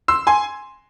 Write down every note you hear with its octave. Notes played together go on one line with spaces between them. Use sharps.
C6 E6
G#5 C6